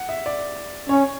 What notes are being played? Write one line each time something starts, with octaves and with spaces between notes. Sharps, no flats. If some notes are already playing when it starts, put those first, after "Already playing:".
Already playing: F#5
E5
D5
C#4 C#5